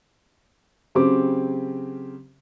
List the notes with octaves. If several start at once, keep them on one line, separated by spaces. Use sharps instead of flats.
C#3 F#3 C4 C#4 G4 D6